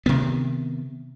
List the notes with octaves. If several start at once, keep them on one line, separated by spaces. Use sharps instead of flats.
C3 D#3 B3